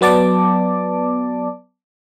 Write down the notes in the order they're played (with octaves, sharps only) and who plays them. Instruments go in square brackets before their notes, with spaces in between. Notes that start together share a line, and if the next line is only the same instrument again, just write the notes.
[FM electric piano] F#3 B3 D5 A5 D6